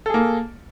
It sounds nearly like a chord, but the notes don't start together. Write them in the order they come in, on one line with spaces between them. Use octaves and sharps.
A4 G#4 A#3